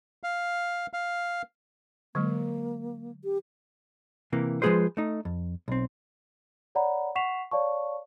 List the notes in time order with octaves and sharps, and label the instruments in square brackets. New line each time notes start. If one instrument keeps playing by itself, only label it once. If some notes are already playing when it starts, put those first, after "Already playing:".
[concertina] F5
F5
[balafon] D3 F#3 G#3 [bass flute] A#3
[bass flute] G4
[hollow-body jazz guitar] C3 E3 A#3
F3 G#3 A3 G#4 B4 C5
A3 D#4
F2
B1 C4
[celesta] C#5 D5 F#5 A#5 B5
F#5 C#6 B6 C7 E7 F7
C#5 D5 F5 A5 C#6